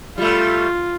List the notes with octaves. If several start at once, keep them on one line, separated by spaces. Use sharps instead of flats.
G3 A3 F4